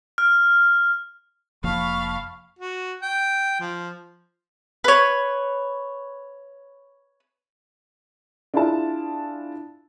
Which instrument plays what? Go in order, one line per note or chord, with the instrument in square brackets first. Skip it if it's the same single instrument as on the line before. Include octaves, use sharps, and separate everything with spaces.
[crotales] F6
[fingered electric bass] F1 F3 A#3 [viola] F5 [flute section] A5 B5 C#6
[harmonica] F#4
G5
F3
[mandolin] B4 C#5
[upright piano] D4 E4 F4 G#4 E5 A5